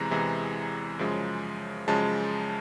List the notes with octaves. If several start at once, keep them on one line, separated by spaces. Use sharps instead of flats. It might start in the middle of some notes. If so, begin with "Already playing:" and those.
Already playing: E2 C3 E3 G#3 A#5
E2 C3 E3 G#3
F#2 C#3 F3 G#3
F#2 C#3 F3 G#3 A5